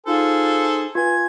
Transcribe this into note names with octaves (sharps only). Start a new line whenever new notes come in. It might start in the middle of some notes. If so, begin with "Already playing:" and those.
D#4 F4 G#4 A4 C5
F4 B4 G#5 G#6